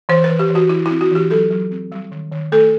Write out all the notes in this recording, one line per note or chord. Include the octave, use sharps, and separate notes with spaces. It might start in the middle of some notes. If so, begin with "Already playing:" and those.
E3 C5
B4
E3
G4
E3 F#4
E3 E4
E4
C4
F#4
E3 G4
F#3 A4
F#3
C4
G3
D#3
D#3
A3 A4